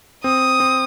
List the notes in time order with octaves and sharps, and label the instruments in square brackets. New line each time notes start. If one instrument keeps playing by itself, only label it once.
[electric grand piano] C4 [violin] D#6
[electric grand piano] C4